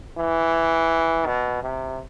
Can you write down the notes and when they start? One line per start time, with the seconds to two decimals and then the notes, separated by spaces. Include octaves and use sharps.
0.18 E3
1.26 B2
1.63 C3